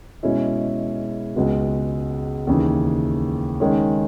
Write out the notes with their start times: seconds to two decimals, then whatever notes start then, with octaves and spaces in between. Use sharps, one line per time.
0.23 B2 G#3 C#4 E4
1.36 C#2 C#3 G#3 B3 F#4
2.47 D#2 C#3 E3
3.60 D#3 G#3 C#4